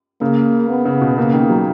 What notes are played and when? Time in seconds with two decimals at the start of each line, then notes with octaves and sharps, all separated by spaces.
0.21 C#3 A#3
0.69 B3
0.85 C#3
1.01 B2
1.17 C#3 A#3
1.33 D#3
1.50 F#3